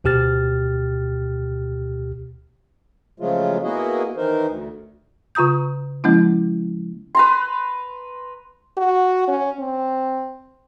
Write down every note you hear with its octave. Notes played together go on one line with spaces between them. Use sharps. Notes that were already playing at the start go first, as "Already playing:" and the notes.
D2 B2 G4 F6 A6
C#3 F3 F#3 G#3 A3 F4
A#3 B3 E4 F#4 G#4 D#5
D#3 E3 D#4 A#4 C5
D2
C#3 F4 A#5 D#6 G6
F3 G#3 A#3 C#4 E4
B4 A#5 C6
F#4
C#4
C4